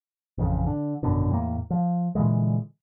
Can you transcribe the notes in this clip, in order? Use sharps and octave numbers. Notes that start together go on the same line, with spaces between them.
A1 F2 C#3
D3
G#1 F#2 B2 D3
E2 A2 A3 A#3
F3
A#2 D3 E3 G#3